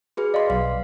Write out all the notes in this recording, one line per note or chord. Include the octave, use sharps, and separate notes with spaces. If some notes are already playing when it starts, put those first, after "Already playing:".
F#4 G#4 B4
D5 D#5 F5 C6
B1 F5